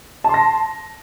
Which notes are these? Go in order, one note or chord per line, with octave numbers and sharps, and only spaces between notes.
A5 C6 A#6